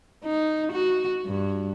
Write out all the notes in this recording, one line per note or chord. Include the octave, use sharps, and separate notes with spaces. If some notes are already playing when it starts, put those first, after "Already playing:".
D#4
F#4
G2